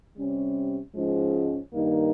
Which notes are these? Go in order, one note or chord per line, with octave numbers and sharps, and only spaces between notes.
C3 G3 C#4
G#2 F3 G#3 C#4
G2 D#3 A#3 D#4